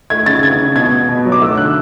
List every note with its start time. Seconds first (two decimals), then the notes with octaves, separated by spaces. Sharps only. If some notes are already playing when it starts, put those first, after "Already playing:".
0.10 A3 G#6
0.26 C#3 A6
0.43 C#3 G#6
0.59 C#3
0.76 B2 G#6
0.92 B2
1.09 B2
1.26 F#3
1.32 D6
1.42 A3 E6
1.57 D3 F#6